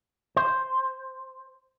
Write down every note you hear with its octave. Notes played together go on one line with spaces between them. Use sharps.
C5